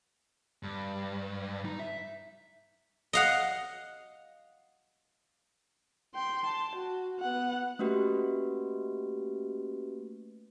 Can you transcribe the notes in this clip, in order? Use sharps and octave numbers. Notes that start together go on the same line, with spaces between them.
G2
D#4
E5
D#5 F5 F#5
G5 C6
A5
F#4
B3 F#5
A3 A#3 C#4 F#4 G4 B4